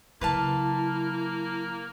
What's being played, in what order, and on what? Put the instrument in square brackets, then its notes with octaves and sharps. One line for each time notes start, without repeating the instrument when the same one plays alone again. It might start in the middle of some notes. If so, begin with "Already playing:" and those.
[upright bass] C#3 F#3 [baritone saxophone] A#3 [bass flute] E4 [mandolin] B4 F5 A5